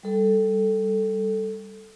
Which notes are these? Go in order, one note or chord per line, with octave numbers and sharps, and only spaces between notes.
G3 A4